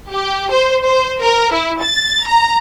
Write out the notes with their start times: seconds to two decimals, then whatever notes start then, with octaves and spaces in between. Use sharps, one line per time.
0.12 G4
0.51 C5
0.84 C5
1.21 A#4
1.52 E4
1.82 A6
2.27 A#5